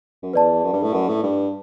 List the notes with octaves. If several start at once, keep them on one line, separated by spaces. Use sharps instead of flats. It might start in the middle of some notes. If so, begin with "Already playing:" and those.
F#2
E2 B4 D5 A5
F#2
G2
A2
F#2
A2
G2